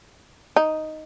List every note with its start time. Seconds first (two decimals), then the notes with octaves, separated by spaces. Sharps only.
0.56 D#4